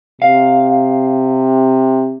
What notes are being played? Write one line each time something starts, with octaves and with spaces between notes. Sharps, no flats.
C3 F5